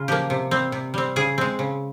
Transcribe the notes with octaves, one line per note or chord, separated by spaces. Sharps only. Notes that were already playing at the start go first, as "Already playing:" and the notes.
Already playing: C#3 F4
F3 A#3 G4
C3
G3 C4
C3
G3 C4
C#3 G#4
G#3 C4
C#3